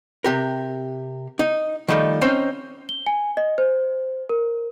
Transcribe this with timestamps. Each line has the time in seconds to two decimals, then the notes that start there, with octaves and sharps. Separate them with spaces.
0.24 C3 G4 A#4
1.39 D#4
1.88 D#3 F3 G3 A3 D4 D#4
2.21 C4 C#4 D#4 C5 F5
2.89 G7
3.06 G#5
3.37 D#5
3.58 C5
4.29 A#4